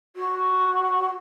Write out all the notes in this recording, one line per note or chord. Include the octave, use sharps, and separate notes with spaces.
F#4